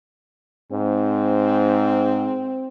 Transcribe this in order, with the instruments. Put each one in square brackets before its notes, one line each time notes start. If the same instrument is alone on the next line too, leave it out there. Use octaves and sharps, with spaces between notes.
[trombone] G#2 [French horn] C4